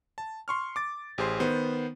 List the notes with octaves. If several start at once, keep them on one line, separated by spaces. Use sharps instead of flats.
A5
C6 C#6 F6
D6 A6
A1 G4 G#4 C5 C6
D#3 B3 C5